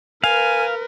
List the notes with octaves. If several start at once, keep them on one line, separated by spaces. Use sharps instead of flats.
A#4 B4 F5 G#5